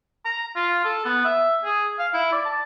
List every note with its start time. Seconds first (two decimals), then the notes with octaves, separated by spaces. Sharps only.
0.25 A#5
0.56 F4
0.84 A4
1.05 B3
1.25 E5
1.64 G#4
1.99 F5
2.14 E4
2.32 D5
2.45 A5